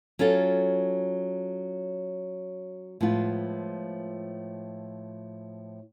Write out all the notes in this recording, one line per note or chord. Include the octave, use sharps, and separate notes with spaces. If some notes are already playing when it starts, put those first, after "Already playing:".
F#3 C#4 F4 A4
A2 F3 G#3 B3 F4